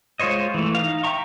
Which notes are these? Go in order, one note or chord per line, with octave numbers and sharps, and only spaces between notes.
G#3 F4 C5 C#5 D#5
E3 A3
D#4 F5
E5 G5 A#5 C#6